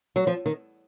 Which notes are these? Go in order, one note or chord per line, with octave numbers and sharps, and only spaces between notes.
F#3
F3
D#3